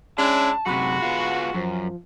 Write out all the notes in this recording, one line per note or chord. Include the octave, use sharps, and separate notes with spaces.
G#3 C#4 D4 E4 A5
F#2 C3 G#3 F#4 B5
B3 F4
F#2 F3